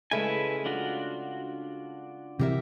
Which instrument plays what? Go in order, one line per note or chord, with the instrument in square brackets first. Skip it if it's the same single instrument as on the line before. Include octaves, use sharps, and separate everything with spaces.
[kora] C#3 G#3 A3 [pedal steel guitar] E4 B4 G#5
[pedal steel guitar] D4 F4 F#4
[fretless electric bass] C3 E3 [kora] G4 A#4 E5